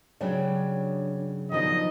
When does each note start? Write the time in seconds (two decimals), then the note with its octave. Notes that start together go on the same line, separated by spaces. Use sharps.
0.21 G2 C#3 F#3 D4 C#5 D5
1.52 B2 D#3 F3 D4 D#5